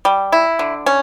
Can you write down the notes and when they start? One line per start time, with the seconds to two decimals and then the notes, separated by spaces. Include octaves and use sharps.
0.05 G3
0.32 E4
0.59 D3
0.86 C#4